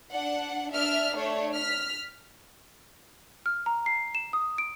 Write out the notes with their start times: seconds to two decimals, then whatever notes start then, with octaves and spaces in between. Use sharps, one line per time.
0.11 D4 F#5
0.71 D4 E5 F6
1.17 A3 D4 C#5
1.54 F6 B6
3.46 F6
3.66 A#5
3.86 C7
4.15 E7
4.33 D#6
4.58 D7